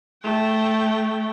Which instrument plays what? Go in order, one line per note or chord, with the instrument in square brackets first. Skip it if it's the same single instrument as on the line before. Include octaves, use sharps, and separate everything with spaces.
[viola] A3 G5